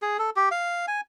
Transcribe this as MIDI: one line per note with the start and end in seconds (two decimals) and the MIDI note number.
0.02 0.17 68
0.19 0.30 69
0.36 0.49 67
0.51 0.86 77
0.88 1.01 80